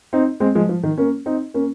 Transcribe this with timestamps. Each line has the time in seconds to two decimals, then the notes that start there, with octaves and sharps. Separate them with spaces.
0.13 C4 D#4
0.40 G#3 C4
0.55 F3 G#3
0.69 F3
0.83 D#3
0.98 A#3 C#4
1.26 C4 D#4
1.54 A#3 C#4